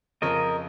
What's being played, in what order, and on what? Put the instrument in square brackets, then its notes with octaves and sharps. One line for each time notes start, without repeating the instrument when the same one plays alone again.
[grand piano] F2 C#3 F3 C#4 [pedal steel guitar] A#4 D#5